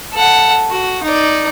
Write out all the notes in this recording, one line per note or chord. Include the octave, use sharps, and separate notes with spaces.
A4 F#5
F#4
D#4 D5